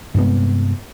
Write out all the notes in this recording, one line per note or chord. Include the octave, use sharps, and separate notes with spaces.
G2 C3 G#3 B3